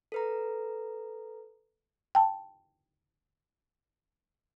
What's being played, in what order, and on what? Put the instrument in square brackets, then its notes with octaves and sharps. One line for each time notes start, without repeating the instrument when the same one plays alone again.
[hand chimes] A4 B4 A#5
[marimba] G5 A5